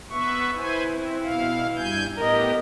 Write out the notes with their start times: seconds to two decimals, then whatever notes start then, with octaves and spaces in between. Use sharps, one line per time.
0.11 B3 B4 E5 C#6
0.57 E4 B4 C5 G#5
0.91 C4
1.23 B2 F5
1.76 G2 G#5 G6
2.17 A2 B3 G4 A#4 D#5